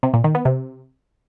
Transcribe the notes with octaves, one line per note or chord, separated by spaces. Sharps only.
C3
A#2
D#3
B3
C3